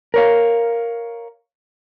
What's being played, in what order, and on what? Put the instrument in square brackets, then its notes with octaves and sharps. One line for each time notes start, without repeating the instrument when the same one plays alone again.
[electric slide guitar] A#4 C#5 F5